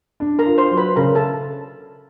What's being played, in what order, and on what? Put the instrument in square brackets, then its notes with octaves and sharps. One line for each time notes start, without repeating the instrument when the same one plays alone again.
[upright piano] D4
[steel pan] A#4 A#5
[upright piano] F4
[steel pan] C5 C6
[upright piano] F#3
[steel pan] B4 B5
[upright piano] C#3 [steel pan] A#4 A#5
[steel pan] A4 A5